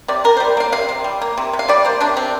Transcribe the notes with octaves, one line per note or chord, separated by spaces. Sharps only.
C3 D5
C3 A#4
C5
G3
A#3 F5
C3 F5
C3
G3
A#3
C3
C3
F5
G3 D5
A#3 C5
C3 D4
C3 C4